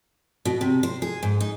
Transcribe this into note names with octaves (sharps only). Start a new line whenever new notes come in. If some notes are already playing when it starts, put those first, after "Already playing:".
B2
C3
C5
G#4
G#2
D#4